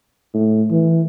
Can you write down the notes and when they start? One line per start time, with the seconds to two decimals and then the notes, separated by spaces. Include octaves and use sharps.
0.34 A2
0.71 E3